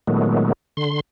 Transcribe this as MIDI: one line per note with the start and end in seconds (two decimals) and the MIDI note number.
0.07 0.52 46
0.07 0.52 51
0.07 0.52 54
0.07 0.52 56
0.07 0.52 57
0.07 0.52 59
0.77 1.00 50
0.77 1.00 84